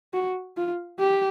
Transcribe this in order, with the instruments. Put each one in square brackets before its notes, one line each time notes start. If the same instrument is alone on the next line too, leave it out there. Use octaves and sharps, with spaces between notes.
[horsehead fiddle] F#4
F4
G4